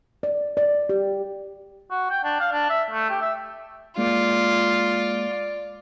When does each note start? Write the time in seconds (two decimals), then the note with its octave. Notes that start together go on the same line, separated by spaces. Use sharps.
0.23 D5
0.57 D5
0.89 G4
1.90 F#4
2.10 G5
2.24 D4
2.40 F5
2.51 D4
2.69 E5
2.90 A3
3.10 G4
3.21 E5
3.98 G#3 A#3 F4 D5